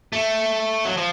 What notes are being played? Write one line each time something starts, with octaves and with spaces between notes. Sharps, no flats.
A3
F#3
F3